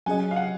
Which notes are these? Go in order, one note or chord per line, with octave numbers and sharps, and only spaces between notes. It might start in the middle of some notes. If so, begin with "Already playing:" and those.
F#3 C#4 G#4 D#5 G#5
F5
F#5